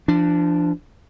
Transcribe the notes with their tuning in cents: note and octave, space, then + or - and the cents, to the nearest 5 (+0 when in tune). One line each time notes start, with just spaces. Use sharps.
F3 -30 D4 +0